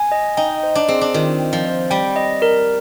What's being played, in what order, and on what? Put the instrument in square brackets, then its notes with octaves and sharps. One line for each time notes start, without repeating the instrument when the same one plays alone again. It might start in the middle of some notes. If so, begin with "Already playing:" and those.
Already playing: [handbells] G#5
D#5
[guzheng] D#4 [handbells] G5
[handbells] C5
[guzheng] D4
[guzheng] C4 [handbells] G#4
[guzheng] D4
[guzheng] D#3 [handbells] F4
[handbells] G5
[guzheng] F3
[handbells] C5
[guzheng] G3 [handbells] G5
[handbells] D#5
A#4